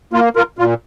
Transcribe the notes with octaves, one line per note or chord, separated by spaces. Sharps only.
A#3 F4
F4 A#4
A#2 F4